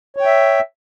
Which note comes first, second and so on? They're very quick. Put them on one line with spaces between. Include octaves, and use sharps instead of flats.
C#5 G5 E5